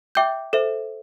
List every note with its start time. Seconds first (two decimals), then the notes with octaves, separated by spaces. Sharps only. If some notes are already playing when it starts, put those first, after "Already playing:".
0.15 E5 G5 D6 G6
0.53 A4 C5 E5